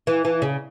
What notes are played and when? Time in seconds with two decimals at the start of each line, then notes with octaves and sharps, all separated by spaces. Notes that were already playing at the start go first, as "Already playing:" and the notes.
0.07 E3
0.25 E3
0.42 C#3